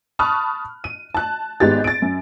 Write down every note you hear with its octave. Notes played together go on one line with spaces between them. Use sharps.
A5 B5 C#6 D#6 F6 F#6
D#7
A5 F#6
G#1 G#2 B3 G4 A6
A6 D7
F#2